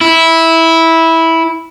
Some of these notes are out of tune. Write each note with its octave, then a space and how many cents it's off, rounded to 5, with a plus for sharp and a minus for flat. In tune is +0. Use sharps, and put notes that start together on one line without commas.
E4 -10